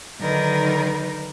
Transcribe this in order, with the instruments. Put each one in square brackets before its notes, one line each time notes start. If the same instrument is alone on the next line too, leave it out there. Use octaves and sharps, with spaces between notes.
[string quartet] D3 D#3 F#3 D#4 A#4 B4